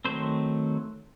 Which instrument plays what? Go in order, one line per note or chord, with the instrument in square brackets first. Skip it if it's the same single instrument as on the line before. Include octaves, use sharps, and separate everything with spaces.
[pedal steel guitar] D#3 F#3 A3 C4 C5